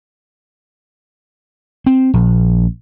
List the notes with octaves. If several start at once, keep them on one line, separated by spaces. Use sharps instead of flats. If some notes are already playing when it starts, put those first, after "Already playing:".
C4
A#1